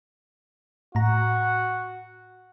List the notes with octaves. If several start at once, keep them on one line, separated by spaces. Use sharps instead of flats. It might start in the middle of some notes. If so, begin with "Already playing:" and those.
A2 F#4 A#5